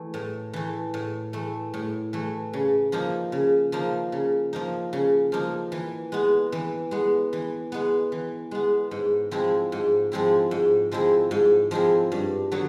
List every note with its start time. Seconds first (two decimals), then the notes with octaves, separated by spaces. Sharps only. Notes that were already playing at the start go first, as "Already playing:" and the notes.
Already playing: E3 A3
0.14 A2
0.53 E3 A3
0.94 A2
1.33 E3 A3
1.74 A2
2.13 E3 A3
2.53 C#3
2.92 F3 A#3 D#4
3.32 C#3
3.72 F3 A#3 D#4
4.12 C#3
4.53 F3 A#3 D#4
4.93 C#3
5.32 F3 A#3 D#4
5.72 E3
6.12 G#3 B3
6.52 E3
6.91 G#3 B3
7.33 E3
7.72 G#3 B3
8.12 E3
8.51 G#3 B3
8.91 G#2
9.31 F3 G#3 C4 E4
9.72 G#2
10.12 F3 G#3 C4 E4
10.51 G#2
10.92 F3 G#3 C4 E4
11.31 G#2
11.71 F3 G#3 C4 E4
12.12 G2
12.52 D3 F#3 B3 E4